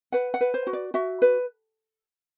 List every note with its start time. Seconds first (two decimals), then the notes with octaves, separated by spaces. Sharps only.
0.12 B4 F#5
0.34 F#5
0.41 B4
0.54 C5
0.67 F#4
0.73 D5
0.94 F#4 E5
1.22 B4